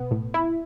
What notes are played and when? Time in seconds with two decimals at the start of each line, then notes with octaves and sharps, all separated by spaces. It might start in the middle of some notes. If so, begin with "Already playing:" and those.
Already playing: B2 B3
0.11 A2
0.34 E4